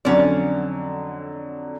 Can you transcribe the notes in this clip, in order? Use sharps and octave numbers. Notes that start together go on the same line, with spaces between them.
F2 D3 F#3 C#4 D5